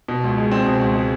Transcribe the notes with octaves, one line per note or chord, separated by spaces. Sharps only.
B2
C#2
G#3
C4
B2
C#2
G#3